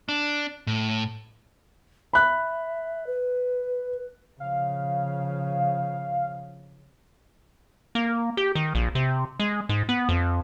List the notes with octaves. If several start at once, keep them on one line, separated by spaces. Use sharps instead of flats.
D4
A2
E5 B5 F#6
B4
C#3 F3 F5
A#3
G4
D#3
A#1
C3
G#3
G#2
B3
F2